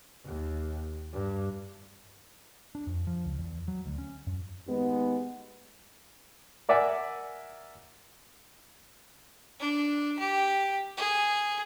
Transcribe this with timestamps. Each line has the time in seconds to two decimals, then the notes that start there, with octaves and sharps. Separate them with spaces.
0.25 D#2
1.13 G2
2.75 D4
2.87 F2
3.07 F3
3.25 C#2
3.39 E2
3.68 F#3
3.86 D2
3.98 C#4
4.27 F#2
4.67 D#2 G#3 B3
6.69 A#4 D5 E5 F#5 G#5
9.60 D4
10.19 G4
10.97 G#4